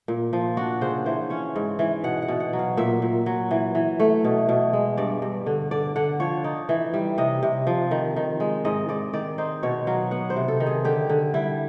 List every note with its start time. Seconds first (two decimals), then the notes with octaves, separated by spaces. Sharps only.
0.08 A#2
0.33 F3
0.57 D4 F#4
0.81 C#3 C5
1.06 E3 C5
1.30 C#4 C#5
1.56 G#2
1.79 E3
2.04 B2 F#5
2.22 F#5
2.28 B2
2.40 F#5
2.53 F#3
2.59 F5
2.77 A#2 E5
3.02 A#2
3.26 F#3
3.51 E3
3.75 E3
4.00 A3
4.25 B2
4.49 B2
4.73 G#3
4.97 G2 D5
5.22 G2
5.46 D3
5.71 D3 D5
5.96 D3 F#5
6.20 F3 C#5
6.44 D#4 D5
6.69 E3
6.94 G3
7.18 C3 D#5
7.43 C3
7.67 F3
7.91 D#3
8.16 D#3
8.40 G#3
8.65 G#2 D#5
8.89 G#2 D5
9.13 D#3 D5
9.38 D#4 C5
9.63 B2 C#5
9.87 F#3 F5
10.11 B3 F#5
10.30 C5
10.36 C3
10.48 A4
10.60 D#3
10.66 G#4
10.85 D3 G4
11.10 D3
11.34 G3 E4